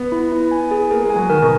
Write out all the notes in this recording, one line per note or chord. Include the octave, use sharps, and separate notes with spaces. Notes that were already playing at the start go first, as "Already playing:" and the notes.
Already playing: B3
E4
E4
G#5
G#4
A#3 G#4
G#3
G#5
F#3
D#3 A#4
B2